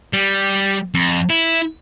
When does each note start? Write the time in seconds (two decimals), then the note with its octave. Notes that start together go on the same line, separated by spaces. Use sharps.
0.13 G3
0.94 F2
1.30 E4